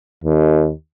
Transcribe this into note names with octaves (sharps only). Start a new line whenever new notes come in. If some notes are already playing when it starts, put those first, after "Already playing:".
D#2